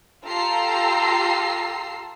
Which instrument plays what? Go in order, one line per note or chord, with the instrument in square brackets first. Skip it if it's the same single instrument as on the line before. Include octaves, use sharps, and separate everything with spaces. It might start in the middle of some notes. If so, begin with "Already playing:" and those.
[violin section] F4 G4 A4 A#5 E6 C7